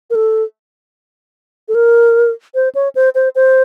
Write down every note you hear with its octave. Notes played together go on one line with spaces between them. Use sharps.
A#4
A4
A4
A#4
C5
C#5
C5
C5
C5